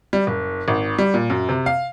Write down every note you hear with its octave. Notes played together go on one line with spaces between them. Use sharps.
G3
F#1
G#1
G3
A#2
F#2
C3
F5